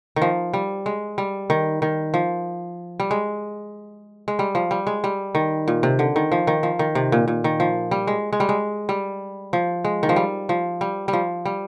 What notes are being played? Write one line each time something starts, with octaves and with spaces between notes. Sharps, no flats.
D#3
F3
G3
G#3
G3
D#3
D#3
F3
G3
G#3
G#3
G3
F3
G3
G#3
G3
D#3
A#2
C3
D3
D#3
F3
D#3
F3
D#3
C3
A#2
A#2
D#3
F3
G3
G#3
G#3
G3
G#3
G3
F3
G#3
D#3
F3
G3
F3
G3
G3
F3
G3